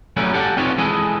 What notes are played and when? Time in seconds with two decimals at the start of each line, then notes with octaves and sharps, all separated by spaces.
0.17 F#3 G3 A3 C#4 A#4 B4
0.33 G4 A4 D5 F5 F#5
0.57 C4 D#4 F4 F#4 B4 C#5
0.78 E3 G#3 G#4 A4 B4 D#5